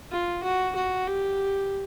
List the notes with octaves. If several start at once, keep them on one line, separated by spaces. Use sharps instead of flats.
F4
F#4
F#4
G4